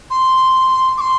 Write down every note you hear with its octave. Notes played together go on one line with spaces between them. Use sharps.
C6
D6
C6